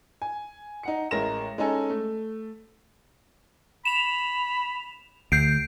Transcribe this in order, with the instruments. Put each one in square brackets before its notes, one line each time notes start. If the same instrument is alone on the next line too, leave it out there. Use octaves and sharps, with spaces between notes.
[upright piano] G#5
D#4 F#5 C#7
A1 G#3 A#4 A#6 E7
G#3 C#4 D#4 A4 G#5
A3
[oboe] B5 [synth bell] E7 F7
[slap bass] D2 [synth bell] G6 C7 D7